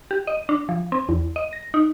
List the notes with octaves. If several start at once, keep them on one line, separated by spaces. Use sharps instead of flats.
G4
D#5
D4
F3
C4
E2
D#5
A#6
D#4